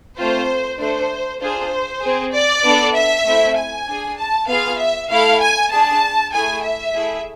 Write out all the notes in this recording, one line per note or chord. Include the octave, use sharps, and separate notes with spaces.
A3 C4 F4 C5
A3 D4 A4 C5
D4 F4 G#4 C5
C4 G#4
D5
B3 D4 A4
E5
A3 C4 E4
G#5
D4 G#4
A5
B3 F4 G#4 F5
E5
A3 E4 A4 F5
G#5
D4 G#4 A5
A3 E4 G#4 G#5
E5
A3 E4 G#4